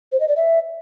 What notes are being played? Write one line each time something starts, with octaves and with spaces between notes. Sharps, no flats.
C5
D#5
D5
E5